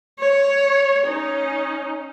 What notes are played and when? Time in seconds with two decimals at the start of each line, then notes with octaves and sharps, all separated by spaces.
0.19 C#5
1.05 C#4 D#4